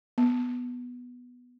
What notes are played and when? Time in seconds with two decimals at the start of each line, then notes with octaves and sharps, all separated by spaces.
0.18 B3